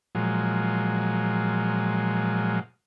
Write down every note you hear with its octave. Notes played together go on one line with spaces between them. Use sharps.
A#2 F3 F#3 G#3